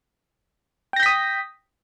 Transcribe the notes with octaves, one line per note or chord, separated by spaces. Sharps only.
G5 D#6 G6 A#6 B6